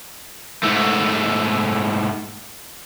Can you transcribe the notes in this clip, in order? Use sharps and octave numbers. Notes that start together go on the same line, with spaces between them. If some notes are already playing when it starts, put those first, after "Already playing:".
G#2 A3